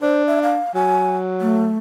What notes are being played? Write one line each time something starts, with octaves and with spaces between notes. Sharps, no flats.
D4 C5
E5
F5
F#3 G#5
A3